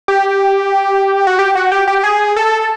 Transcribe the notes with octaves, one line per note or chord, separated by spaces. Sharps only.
G4
F#4
G4
F#4
G4
G4
G#4
A4